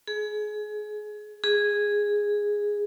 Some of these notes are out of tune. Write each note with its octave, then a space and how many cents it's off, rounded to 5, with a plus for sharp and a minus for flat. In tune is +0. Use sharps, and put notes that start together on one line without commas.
G#4 +25
G#4 -5